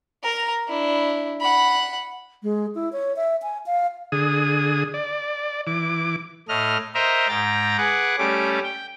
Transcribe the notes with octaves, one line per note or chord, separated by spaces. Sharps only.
A#4 A#5
D4 E4
F#5 B5
G#3
E4
C#5
E5
G#5
F5
D3 G#4 D#6
D5
E3 D6
A2 A3 D#5 F6
A#4 C5 D#5 E5 A#5
G#2 G5 A#5 A6
G#4 B4 F#5 D6
G3 A3 C#4 D6
G5